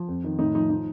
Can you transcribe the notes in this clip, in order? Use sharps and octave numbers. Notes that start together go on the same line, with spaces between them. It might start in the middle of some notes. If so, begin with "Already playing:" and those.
Already playing: F3
F2
D#3
A2 D#4
F3 D#4
F3 D#4